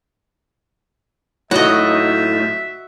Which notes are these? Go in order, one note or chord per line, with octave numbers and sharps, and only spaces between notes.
A2 F#3 A3 D#4 F4 F#4 D#5 E5